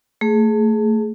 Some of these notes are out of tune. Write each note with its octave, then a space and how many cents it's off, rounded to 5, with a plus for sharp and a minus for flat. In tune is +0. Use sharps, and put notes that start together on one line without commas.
A3 +20 G#4 +15